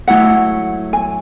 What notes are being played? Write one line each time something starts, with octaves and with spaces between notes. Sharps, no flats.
F#3 A3 E4 F#5
G#5